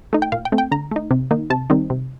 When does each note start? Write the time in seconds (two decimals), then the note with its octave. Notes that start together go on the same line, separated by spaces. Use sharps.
0.13 A3 D#4
0.22 G5
0.32 A#2 F5
0.45 G5
0.52 A3 C4
0.58 G5
0.71 D3 A#5
0.91 A3 D#4
1.11 C3
1.31 D#3 A#3 D#4
1.50 C3 A5
1.70 D#3 G3 C4 D#4
1.90 C3